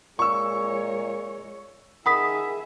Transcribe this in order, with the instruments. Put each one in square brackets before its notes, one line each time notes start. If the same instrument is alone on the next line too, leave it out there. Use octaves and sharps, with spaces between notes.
[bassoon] A#2 [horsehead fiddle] G#3 C#5 [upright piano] C#6 E6
[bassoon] D#3 [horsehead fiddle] G#4 E5 [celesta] F#5 D#6 B6 [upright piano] B5